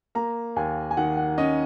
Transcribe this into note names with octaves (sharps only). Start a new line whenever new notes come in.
A#3 A#5
D#2 G#5
G#5
D#3 F#5
F#5
C#4 D#5